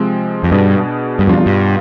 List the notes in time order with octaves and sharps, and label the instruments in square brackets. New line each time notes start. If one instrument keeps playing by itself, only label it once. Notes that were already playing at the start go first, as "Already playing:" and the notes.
Already playing: [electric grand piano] C3 F3 G#3 C4
[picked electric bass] F2
[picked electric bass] G2 [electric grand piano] B2 B3 D4 G#4
[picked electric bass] G2
[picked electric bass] F2 [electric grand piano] B2 G3 D4 F4
[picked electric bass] G2